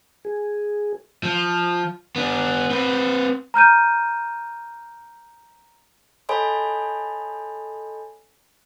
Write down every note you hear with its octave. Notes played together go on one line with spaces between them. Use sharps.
G#4
F3
B3 D4
C4 B4
A#5 F6 G6 D#7
A4 C#5 D#5 G#5 B5 C6